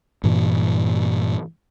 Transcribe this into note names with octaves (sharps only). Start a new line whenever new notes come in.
G2 A#2 E3